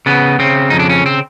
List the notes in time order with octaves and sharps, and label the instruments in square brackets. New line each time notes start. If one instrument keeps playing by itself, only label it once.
[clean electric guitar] C#3 B3
C#3 C4
F2 D#4
D4
C#4
C4